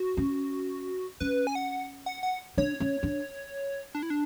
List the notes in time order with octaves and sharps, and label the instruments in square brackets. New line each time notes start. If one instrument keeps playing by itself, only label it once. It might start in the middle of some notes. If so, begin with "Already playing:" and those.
Already playing: [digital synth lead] F#4
[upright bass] C#4
[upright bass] C#4 [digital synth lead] B4
[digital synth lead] G#5
F#5
F#5
F#5
[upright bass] D4 [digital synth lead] C#5
[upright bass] C#4
D4
[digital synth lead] D4
E4
D4